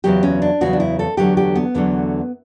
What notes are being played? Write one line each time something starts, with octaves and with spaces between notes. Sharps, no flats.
E2 C#3 F#3 G4
C#4
D4
E2 C#3 F#3 F#4
D4
E4
A4
E2 D3 F#3 A3 G4
G4
B3
E2 D3 F#3 A3